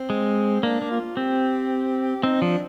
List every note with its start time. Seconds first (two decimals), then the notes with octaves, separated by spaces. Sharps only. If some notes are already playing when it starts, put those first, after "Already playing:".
Already playing: C4
0.10 G#3
0.63 A#3 D4
0.82 A#3
0.91 F4
1.17 C4 G4
2.23 C4 D#4
2.41 F3 D4